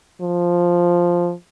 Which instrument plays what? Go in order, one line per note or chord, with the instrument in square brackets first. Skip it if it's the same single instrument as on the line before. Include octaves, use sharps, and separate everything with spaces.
[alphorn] F3